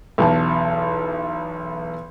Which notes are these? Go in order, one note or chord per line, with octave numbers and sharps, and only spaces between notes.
B1 E2 A5